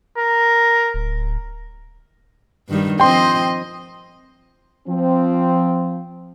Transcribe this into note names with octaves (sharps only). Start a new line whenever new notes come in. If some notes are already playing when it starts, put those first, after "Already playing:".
A#4
D1
G2 D#3 G3
F3 C4 D#5 G5 C6
F3 C4